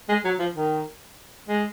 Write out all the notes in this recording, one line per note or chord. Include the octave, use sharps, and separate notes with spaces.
G#3
F#3
F3
D#3
G#3